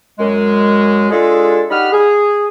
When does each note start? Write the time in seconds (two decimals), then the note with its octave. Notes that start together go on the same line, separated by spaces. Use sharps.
0.19 F#2 G#3
1.11 G#3 D4 F4 G#4 A4
1.71 G3 D#4 F#5 B5 F6
1.93 G#4